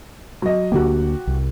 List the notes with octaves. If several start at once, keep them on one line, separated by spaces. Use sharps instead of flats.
F#3 D#5
D2 D3 A#3 F#4 G4
C2